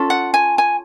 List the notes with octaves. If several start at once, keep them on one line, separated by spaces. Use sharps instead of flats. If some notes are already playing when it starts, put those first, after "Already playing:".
Already playing: C#4 F4 A4
F#5
G#5
G#5